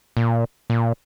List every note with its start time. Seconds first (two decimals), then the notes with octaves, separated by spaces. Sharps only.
0.17 A#2
0.70 A#2